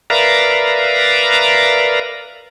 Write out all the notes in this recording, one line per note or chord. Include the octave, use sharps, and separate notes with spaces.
A#4 B4 D5 E5 F5 A#5